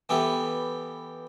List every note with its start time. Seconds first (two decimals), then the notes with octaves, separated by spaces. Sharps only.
0.09 E3 B3 G4 A4